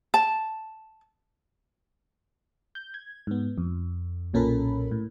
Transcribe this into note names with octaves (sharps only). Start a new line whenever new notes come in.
A5
G6
G#6
G#2 B3
F2
B1 A#2 C#4 A4 A#4 B5
A2